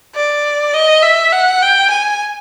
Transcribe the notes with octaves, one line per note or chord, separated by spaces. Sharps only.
D5
D#5
E5
F#5
G5
G#5